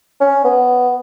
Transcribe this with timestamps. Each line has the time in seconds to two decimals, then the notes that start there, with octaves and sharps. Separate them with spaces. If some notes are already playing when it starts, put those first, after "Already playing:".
0.20 C#4
0.44 B3